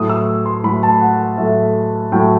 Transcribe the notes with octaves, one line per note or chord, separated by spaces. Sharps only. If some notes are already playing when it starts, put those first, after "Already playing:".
Already playing: A2 F#3 A3 D#6
E6
C6
A2 F#3 A3 B5
A5
F#5
A2 F#3 A3 E5
A2 F#3 A3 G5